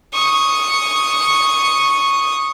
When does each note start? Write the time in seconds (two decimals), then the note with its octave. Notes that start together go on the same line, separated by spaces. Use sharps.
0.14 C#6 D#6